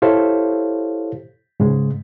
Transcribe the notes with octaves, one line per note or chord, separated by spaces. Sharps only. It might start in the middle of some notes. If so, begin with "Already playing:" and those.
E4 G4 A4 C5 C#5 F5
G#2 C#3 G#3